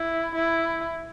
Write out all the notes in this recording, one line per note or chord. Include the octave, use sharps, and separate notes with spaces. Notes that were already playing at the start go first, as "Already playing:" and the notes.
Already playing: E4
E4